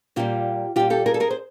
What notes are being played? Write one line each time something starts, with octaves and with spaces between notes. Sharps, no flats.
A#2 G3 F4 G4
A#2 G3 F4 G4
G4 A4
G#4 A#4
A4
G#4 A#4
C5